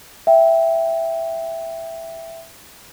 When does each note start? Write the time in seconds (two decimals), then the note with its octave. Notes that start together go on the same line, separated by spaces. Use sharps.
0.27 E5 G5